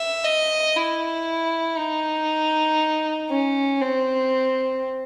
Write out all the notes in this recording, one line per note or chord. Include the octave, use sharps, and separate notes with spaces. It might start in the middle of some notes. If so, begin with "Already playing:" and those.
Already playing: E5
D#5
E4
D#4
C#4
C4